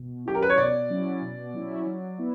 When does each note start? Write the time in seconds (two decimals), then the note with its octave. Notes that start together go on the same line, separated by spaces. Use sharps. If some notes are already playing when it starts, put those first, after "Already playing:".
Already playing: B2
0.26 F#3 C#4 E4 G4
0.35 A#4
0.43 B4
0.50 C#5
0.57 B2 D5
0.90 F#3 C#4 E4
1.22 B2
1.54 F#3 C#4 E4
1.86 F#3
2.18 B3 E4